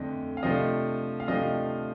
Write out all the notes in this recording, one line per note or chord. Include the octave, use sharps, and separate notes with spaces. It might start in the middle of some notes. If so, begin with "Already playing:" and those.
Already playing: F2 D3 A3 D4 D#5
F5
C3 F3 A3 D4 D#5
F5
C3 F3 A3 D4 D#5